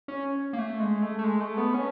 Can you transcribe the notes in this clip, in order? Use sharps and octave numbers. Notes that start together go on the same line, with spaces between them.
C#4
A#3
A3
G#3
A3
A3
G#3
A3
B3
C#4